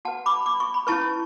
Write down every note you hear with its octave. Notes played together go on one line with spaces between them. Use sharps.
F#4 B4 F#5 A5
B5 D6
D6
C#6
B5
C#4 E4 B4 A5 C#6